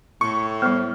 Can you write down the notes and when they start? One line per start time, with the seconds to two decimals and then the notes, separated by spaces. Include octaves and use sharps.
0.21 A2 C#6 C#7
0.62 G3 B3 C5 F6